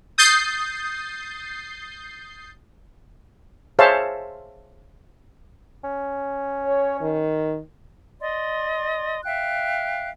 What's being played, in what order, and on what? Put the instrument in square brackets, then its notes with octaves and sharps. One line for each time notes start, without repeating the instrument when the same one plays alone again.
[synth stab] D#6 G6 A6 C7
[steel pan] G#4 C5 C#5 E5 F5 A5
[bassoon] C#4
[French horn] C#5
D#3
[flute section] D5 D#5 C6
E5 F5 G5 F#6